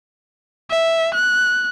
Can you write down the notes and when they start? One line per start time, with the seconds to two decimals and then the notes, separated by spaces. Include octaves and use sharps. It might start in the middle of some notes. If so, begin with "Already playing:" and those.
0.70 E5
1.14 F#6